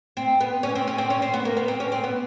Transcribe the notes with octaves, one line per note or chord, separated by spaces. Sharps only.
C4
B3
C#4
C4
C#4
C4
C#4
C4
B3
A#3
B3
C4
C#4
C4
B3